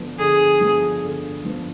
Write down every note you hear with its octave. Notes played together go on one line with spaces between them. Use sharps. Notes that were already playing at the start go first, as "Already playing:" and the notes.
Already playing: D3 F3 B3
D3 G#4
F3 B3
D3
F3 B3